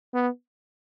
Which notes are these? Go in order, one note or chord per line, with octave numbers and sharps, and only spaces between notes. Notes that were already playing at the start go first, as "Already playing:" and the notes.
B3